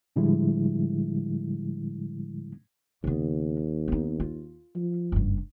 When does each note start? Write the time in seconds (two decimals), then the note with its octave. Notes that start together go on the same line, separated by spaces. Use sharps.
0.16 A2 D3 F3 G3 G#3 E4
3.04 D#2 C#3 B3
3.88 B3 D#4
4.20 F4
4.75 F3
5.12 F#1 G2